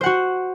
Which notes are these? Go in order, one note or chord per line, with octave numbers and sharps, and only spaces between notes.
F#4 C5 F#5